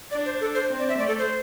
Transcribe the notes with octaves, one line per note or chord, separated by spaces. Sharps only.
D4 D5
C5
A4
C5
C4
D5
E5
A3 D5
A4
C5